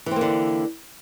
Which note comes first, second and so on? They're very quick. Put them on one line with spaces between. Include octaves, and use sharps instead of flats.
E3 C4 A#3 D3